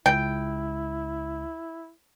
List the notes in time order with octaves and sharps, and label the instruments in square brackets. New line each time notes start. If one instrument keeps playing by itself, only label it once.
[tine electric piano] C#2 [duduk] E4 [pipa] G5